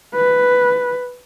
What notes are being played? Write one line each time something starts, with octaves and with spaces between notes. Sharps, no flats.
B4